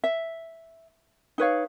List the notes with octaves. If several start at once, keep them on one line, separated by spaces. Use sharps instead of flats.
E5
D#4 B4 C#5 F5